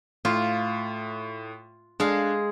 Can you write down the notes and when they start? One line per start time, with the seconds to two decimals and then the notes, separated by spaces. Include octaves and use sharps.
0.25 A2 F4
2.00 G#3 D4 G#4 F5